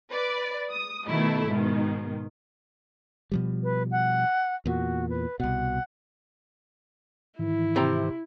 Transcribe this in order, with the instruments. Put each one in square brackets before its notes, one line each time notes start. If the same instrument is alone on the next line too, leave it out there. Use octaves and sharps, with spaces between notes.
[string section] B4 D5
D#6
B2 D#3 A3 E4
G#2 B2 D#3
[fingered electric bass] B2 F3 G3
[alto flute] B4
F#5
[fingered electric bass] E2 A#2 [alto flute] F#4
[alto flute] B4
[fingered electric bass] C2 B2 [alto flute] F#5
[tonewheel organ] G#2 D#3 E3 [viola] E4
[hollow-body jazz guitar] C3 C4 A#5